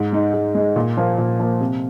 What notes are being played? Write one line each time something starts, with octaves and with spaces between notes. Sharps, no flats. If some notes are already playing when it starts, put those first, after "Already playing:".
Already playing: G#2
G#3 D#4
G#2
G#3 D#4
A#2
F3 A#3
A#2
F3 A#3
C3